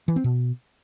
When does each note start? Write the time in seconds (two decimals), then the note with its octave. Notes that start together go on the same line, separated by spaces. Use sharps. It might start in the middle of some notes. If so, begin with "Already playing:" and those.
0.08 E3
0.16 C4
0.24 B2